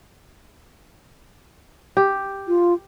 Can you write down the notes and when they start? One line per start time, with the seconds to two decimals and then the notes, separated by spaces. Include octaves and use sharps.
1.97 G4
2.48 F4